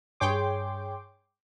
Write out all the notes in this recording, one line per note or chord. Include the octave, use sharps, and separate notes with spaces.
G2 G#4 C#5 G5 C6 D6